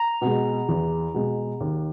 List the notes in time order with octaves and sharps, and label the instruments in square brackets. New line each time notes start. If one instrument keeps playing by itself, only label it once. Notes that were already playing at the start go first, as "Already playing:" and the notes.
Already playing: [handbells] A#5
[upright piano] B2 G#3
E2
B2 G#3
D#2